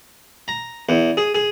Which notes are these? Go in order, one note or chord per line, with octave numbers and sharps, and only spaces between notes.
A#5
E2
G#4
G#4